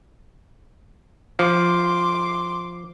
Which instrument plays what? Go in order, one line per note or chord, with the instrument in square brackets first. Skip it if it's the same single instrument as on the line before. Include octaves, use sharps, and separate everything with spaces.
[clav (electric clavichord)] F3 [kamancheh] C6 D6